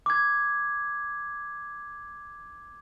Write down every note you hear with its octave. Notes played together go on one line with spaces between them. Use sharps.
D6 G#6